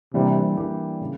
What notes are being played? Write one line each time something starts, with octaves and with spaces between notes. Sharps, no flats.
C3 E3 G3 A#3 D4 G4
E3 G3 A#3 D4 G4
C#3